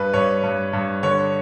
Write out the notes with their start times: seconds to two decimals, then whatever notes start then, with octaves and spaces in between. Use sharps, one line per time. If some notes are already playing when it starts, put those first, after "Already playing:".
Already playing: G2 B4
0.14 G2 C#5
0.43 G2
0.73 G2
1.03 D3 C#5